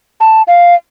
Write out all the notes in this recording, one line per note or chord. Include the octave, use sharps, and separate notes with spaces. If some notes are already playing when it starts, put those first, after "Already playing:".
A5
F5